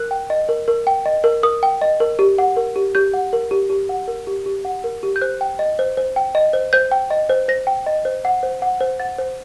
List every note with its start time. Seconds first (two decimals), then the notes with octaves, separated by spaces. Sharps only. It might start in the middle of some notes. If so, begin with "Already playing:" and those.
Already playing: A#4 F#6
0.11 G5
0.30 D#5
0.49 A#4
0.68 A#4
0.87 G5
1.06 D#5
1.24 A#4
1.43 A#4 D#6
1.63 G5
1.81 D#5
2.00 A#4
2.19 G4
2.38 F#5
2.57 A#4
2.76 G4
2.95 G4 G6
3.14 F#5
3.33 A#4
3.51 G4
3.70 G4
3.89 F#5
4.08 A#4
4.27 G4
4.46 G4
4.65 F#5
4.84 A#4
5.03 G4
5.16 G6
5.21 C5 F#6
5.41 G5
5.59 D#5
5.79 C5
5.97 C5
6.16 G5
6.35 D#5
6.53 C5
6.73 C5 G6
6.91 G5
7.10 D#5
7.29 C5
7.48 C5 A#6
7.67 G5
7.86 D#5
8.05 C5
8.25 F#5
8.43 C5
8.62 F#5
8.81 C5
9.00 F#5 A6
9.18 C5